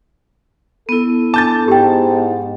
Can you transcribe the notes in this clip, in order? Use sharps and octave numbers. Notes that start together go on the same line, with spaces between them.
B3 E4 A4
D4 A5 D6 G6 A6
G#2 G4 G5